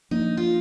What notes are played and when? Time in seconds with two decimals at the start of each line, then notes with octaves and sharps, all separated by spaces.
0.11 F3 A#3 D4 D#4
0.37 F4